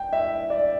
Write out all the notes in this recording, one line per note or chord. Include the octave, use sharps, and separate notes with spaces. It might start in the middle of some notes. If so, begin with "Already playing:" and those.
Already playing: G5
E5
D5